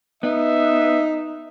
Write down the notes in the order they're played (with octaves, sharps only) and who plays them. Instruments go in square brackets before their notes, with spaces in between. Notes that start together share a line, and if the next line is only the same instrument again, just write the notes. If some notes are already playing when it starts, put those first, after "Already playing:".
[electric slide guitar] B3 [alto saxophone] D#4 [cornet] E5